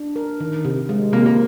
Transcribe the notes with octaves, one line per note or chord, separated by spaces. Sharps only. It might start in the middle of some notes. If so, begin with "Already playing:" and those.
Already playing: D4
A#4
D#3
C3
G#3
C3 A#3
A#3